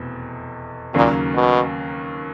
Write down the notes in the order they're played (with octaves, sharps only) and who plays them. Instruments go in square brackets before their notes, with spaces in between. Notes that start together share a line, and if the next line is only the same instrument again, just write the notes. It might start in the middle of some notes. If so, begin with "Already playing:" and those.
Already playing: [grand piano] F1 E2 B2
[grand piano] D#2 C#3 F#3 A#3 C#4 [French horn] A#2
[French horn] B2